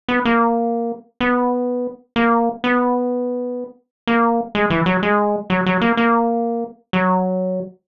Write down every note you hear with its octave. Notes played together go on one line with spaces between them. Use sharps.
B3
A#3
B3
A#3
B3
A#3
G#3
E3
F#3
G#3
F#3
F#3
A#3
A#3
F#3